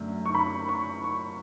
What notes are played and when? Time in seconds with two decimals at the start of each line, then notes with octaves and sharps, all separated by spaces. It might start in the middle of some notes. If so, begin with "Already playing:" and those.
Already playing: F#2 D3 A3
0.26 C#6
0.35 B5
0.69 C#6
1.04 C#6